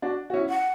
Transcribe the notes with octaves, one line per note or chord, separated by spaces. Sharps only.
D4 F#4
F#4
C#4 E4
F#5